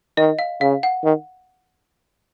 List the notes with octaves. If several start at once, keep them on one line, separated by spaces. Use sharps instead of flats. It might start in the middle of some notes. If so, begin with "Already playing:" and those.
D#3 D#5
F5
C#3 F5
F#5
D#3